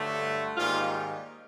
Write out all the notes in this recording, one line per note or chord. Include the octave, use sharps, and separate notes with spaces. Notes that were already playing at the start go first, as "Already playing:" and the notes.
Already playing: G2 D3 F#3 A3
G#2 D#3 G3 A#3 F4